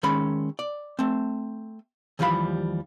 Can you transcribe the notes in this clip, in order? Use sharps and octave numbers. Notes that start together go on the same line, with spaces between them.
D#3 G#3 C#4 E5 B5
D5
A3 C4
D#2 E3 F3 G3 F5 B5